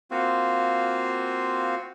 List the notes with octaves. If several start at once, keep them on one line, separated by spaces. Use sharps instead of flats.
A#3 C4 F4 F#4